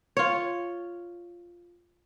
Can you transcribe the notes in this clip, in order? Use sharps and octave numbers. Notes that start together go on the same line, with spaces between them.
F4 C#5